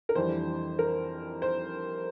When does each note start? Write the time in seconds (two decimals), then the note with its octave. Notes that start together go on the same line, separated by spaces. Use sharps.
0.09 A#4
0.15 F2 E3 G3 D4 C5
0.79 A#4
1.42 C5